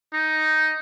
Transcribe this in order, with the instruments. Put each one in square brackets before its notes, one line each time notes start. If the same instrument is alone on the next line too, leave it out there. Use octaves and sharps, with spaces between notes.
[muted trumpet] D#4